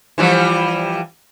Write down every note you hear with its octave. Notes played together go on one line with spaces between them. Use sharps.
E3 F3 G3